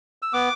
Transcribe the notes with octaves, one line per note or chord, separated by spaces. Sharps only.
E6
B3 D6